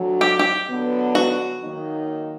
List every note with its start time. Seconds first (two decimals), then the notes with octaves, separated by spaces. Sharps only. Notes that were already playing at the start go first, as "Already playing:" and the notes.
Already playing: D2 D3 F#3
0.21 G4
0.39 G4
0.67 D3 F#3 B3
1.15 F#4
1.61 D#3 F#3 A#3 D#4